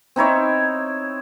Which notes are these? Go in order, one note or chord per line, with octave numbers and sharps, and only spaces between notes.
C4 D#4 E4 C#5